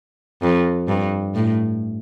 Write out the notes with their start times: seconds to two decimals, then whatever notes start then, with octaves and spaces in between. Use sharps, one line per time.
0.42 F2
0.88 G2
1.35 A2